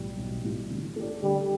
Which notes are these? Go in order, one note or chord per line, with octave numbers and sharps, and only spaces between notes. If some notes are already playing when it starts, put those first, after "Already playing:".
Already playing: B1 A2 E3 G3
B1
A2 E3 G3
D3
A3 G4 D5
D3 G3